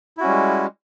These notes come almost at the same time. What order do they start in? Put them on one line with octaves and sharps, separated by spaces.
E4 F#4 C#4 G3 G#3